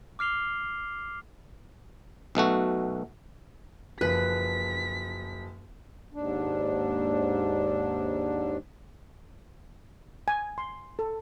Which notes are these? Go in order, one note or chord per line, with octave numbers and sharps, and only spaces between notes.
D6 F6 C7 F7 G7
B1 B2 A3 F#4
F#1 F3 B4 B6
D#2 G#2 D4
G#5
C6
A4